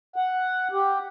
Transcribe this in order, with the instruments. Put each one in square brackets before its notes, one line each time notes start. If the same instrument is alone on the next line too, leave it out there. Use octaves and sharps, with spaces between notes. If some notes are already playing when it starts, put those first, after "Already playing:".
[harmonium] F#5
G4